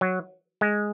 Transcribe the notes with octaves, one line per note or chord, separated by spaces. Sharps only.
F#3
G#3